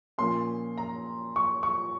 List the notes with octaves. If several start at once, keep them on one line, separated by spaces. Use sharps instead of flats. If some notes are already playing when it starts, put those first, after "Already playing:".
A#2 F3 A#3 C#4 C6
A#5
C#6
C#6